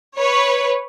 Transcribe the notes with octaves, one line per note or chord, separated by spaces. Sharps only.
B4 C#5